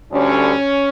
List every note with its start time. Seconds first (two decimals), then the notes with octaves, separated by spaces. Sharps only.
0.12 D2 D3 G3 C#4